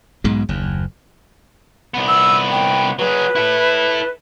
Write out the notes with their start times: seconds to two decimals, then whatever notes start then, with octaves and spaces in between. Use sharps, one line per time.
0.24 B1 G#2 B2 G#3
0.49 F#1 D#2
1.94 C2 B3
2.08 E6
2.51 G5
2.99 F#3 G#4 B4
3.35 E4 A4